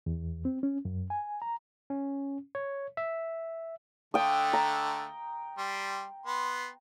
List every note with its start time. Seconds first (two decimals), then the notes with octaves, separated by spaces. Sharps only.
0.06 E2
0.45 C4
0.63 C#4
0.85 F#2
1.10 G#5
1.42 A#5
1.90 C#4
2.55 C#5
2.97 E5
4.14 D3 A3 G5 D#6
4.53 A#5
5.58 G3 C6
6.26 B3 C6